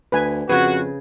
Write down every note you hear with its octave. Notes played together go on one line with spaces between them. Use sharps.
D2 B4 G#5
F2 C#3 F#4 G#4 B4